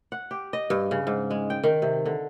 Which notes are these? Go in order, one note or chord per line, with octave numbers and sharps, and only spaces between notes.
F#5
G4
D#5
G2
C#3
G#2
G#3
G5
D#3
C3
D3